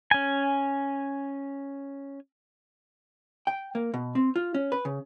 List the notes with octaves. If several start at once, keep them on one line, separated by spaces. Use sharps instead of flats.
C#4 G#5
G5
A#3
B2
C4
F4
C#4
B4
C#3